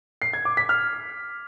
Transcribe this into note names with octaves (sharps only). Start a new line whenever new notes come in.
C7
G#6
D6
B6
F6